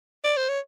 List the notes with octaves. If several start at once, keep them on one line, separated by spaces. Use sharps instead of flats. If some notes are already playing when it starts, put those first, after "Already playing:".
D5
C5
C#5